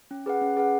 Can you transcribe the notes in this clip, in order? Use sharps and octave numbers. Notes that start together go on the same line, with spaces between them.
C#4
G#4 B4 F#5
C#4
G#4 B4 F#5